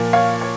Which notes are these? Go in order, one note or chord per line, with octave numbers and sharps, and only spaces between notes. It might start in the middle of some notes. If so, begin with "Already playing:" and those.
Already playing: A#2 F3
C#5 F5
C#5